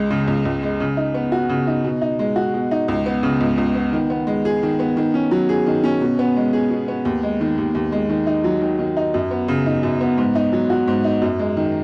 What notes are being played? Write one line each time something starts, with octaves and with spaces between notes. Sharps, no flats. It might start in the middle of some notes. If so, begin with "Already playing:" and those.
Already playing: C#2 G#3
C#3
C#2
C#2
G#3
C#3
D#4
B3
F#4
C#3
D#4
B2
D#4
G#3
F#4
B2
D#4
C#2
B3
C#3
C#2
C#2
B3
D#3
B3
G#3
G#4
D#3
B3
D#3
C#4
F#3
G#4
D#3
C#4
B2
B3
G#3
G#4
B2
B3
D#2
G#3
D#3
D#2
D#2
G#3
D#3
D#4
F#3
D#3
D#3
D#4
F#2
B3
C#3
D#4
F#2
B3
G#2
D#4
F#3
F#4
G#2
D#4
F#2
G#3
D#3